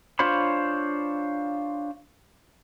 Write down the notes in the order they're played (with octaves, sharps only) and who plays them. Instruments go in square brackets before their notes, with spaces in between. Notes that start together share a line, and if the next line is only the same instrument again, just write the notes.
[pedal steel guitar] D4 F4 C5 C#5 B5